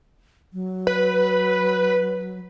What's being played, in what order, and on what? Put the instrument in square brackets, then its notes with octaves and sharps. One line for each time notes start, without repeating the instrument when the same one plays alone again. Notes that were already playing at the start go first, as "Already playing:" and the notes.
[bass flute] F#3
[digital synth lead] B4